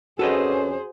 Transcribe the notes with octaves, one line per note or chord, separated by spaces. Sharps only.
F2 C#4 F#4 G#4 A4 B4 C5 D#5